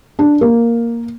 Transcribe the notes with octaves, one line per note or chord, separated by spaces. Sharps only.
D4
A#3